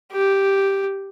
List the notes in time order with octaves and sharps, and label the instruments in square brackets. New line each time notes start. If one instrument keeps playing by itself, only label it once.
[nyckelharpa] G4